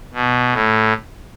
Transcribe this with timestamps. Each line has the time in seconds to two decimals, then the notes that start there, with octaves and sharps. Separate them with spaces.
0.14 B2
0.53 A2